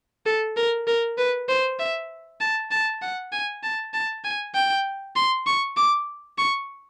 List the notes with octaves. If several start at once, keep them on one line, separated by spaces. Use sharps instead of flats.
A4
A#4
A#4
B4
C5
E5
A5
A5
F#5
G#5
A5
A5
G#5
G5
C6
C#6
D6
C#6